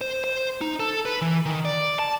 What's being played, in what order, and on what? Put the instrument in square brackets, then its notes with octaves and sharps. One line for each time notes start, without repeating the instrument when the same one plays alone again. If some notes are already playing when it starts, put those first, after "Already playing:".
[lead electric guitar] C5
C5
D#4
A4
B4
E3
D#3
D5
A5